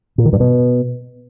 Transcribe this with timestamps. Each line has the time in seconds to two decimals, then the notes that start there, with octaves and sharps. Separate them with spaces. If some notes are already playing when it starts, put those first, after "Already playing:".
0.18 A#2
0.25 D#3
0.33 G2
0.40 B2